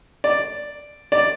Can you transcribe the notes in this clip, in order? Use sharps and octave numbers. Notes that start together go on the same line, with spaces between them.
D5
D5